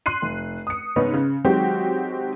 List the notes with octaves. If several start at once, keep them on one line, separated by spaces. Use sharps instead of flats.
C6 F#6 C7 D#7
F1
D#6 C#7
G#2 C#3 B3 C#4 D#4
C#3
D#3 F#3 G#3 C4 F#4 G4